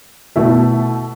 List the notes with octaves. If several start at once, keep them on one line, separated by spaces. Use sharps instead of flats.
B2 A3 E4 A4 E5